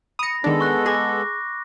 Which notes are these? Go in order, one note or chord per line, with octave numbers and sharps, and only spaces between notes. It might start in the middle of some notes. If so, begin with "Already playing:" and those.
B5 D#6 A#6 C#7
D#3 G#3 B3 D4 A4
C#6 F#6 A#6
G#4 D6 A#6